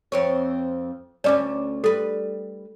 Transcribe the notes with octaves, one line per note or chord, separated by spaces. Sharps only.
F2 C4 C#5
D2 C#4 A4 C#5 D5 D6
G3 A4 B4